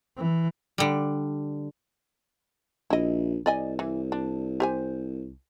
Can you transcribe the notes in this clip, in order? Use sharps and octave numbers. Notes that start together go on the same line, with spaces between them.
E3
D3 G3
A#1 E4 D#5
C2 D5 D#5 G#5
E3
D4
G4 C5 G#5